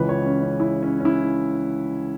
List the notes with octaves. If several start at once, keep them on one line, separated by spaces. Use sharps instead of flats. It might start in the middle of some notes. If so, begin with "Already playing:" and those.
Already playing: C#2 C#3 E3 G#3 B4
C#5
C#4
C#4
E4
C#4
C#4
E4